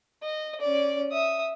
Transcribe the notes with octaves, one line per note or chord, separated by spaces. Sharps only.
D#5
C#4 D5
E5 D#6